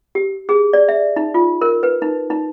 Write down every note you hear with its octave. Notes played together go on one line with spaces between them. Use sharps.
G4
G#4
D5
E5
D#4
F4
A#4
B4
D#4
D#4